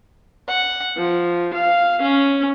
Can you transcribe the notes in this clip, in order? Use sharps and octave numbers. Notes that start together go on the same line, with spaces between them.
F#5
F3
F5
C#4